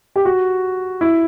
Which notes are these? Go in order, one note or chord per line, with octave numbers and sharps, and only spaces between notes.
G4
F#4
E4